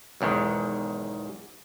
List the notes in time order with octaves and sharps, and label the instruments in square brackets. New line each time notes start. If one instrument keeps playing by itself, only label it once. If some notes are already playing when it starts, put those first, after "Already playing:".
[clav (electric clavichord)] B1 E2 G#2 D#3